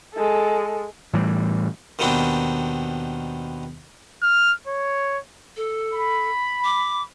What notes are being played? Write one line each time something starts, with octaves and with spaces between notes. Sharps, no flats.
G#3 A4
A2 E3 G3
D#2 B2 D#3 B3 C4 D4
F6
C#5
A4
B5
D6